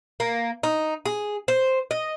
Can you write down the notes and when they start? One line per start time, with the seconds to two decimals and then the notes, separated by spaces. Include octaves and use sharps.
0.20 A#3
0.63 D#4
1.05 G#4
1.48 C5
1.91 D#5